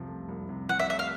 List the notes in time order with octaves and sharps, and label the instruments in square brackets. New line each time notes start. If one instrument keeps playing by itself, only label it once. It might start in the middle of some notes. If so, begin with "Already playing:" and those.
Already playing: [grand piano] C2 C3 F3
A3
C2
C3
[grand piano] F3 [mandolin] F#5
[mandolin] E5
[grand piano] A3 [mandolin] E5
[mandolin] F5